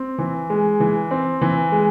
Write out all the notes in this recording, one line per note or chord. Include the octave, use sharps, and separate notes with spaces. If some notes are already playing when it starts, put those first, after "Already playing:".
Already playing: C4
E3
G#3
E3
C4
E3
G#3